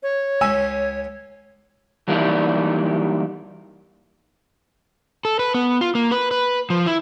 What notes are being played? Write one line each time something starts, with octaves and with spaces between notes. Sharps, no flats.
C#5
C#2 C#4 G#5 E6
E3 F#3 G3 A#3 D4 D#4
A4
B4
B3
F4
A#3
B4
B4
F3
E4